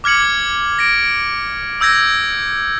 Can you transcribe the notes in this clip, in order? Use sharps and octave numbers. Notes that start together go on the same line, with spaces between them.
D6 F6 G#6 C#7 F#7
A#6 D7
D#6 E6 G6 G#6 A#6